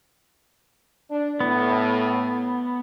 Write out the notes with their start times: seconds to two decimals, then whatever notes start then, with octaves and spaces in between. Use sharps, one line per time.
1.10 D4
1.40 A2 B3